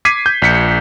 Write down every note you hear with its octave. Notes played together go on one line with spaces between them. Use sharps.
D6 G#6 B6 C7 D#7
G6
A#1 B6 C#7